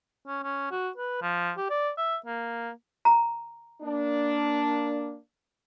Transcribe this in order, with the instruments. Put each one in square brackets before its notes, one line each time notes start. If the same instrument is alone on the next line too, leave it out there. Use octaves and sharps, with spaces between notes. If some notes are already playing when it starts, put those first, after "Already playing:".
[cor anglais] C#4
C#4
F#4
B4
F3
G4
D5
E5
A#3
[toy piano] A#5
[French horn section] A#3 D4